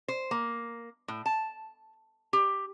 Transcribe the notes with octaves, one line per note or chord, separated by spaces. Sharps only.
C5
A#3
A2
A5
G4